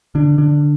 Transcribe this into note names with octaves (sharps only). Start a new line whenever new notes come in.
D3 D4
D3 D4